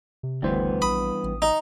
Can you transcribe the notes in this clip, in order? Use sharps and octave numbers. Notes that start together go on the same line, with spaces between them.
C3
F#1 D2 G2 E3 B3 C5
A#1 B5 D#6
A1
D#4